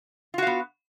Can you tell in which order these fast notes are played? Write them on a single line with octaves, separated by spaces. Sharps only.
F4 F#4 F5 B3